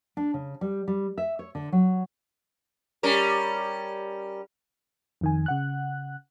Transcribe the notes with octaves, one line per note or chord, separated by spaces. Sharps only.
D4
C#3
G3
G3
E5
C#5
D3
F#3
G3 C#4 A#4
F2 D#3 G#5
C#3 F#5 F#6